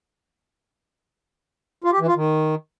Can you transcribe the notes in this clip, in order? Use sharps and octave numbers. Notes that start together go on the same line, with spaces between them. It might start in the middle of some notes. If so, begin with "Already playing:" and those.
F4
G4
E3
F4
D#3